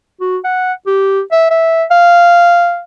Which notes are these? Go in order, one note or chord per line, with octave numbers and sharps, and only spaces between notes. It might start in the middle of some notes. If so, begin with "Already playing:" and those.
F#4
F#5
G4
E5
E5
F5